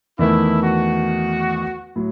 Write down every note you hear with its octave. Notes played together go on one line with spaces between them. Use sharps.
E2 D#3 A3 E4
F#4
A2 F#3